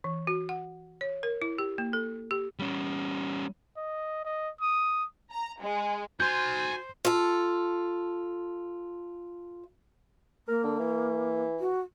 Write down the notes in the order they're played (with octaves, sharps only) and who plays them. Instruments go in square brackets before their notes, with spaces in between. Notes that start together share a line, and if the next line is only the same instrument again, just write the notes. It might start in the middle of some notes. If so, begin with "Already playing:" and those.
[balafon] E3
F#4
F#5
C#5
A#4
E4
G4
A#3
A4
G4
[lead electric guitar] G3 C#4
[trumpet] D#5
D#5
D#6
[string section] A#5
G#3
[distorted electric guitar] F#4 C6 [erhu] C5 [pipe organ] G#5 [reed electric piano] G6
[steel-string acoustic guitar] F4 A4
[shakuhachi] A#3 [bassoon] A#4
[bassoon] D3
E3
[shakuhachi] F#4